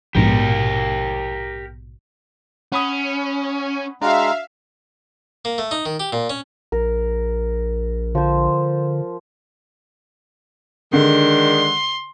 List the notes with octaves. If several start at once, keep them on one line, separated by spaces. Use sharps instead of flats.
A#1 G#2 B2 G4 A#4
C#4 F#5 B5 D#6
G#3 D4 F#4 E5 F5 A#5
A#3
A3
D#4
D#3
G4
A#2
C#4
A#1 A#4
D3 F3 C5
D3 D#3 G#3 D4 C6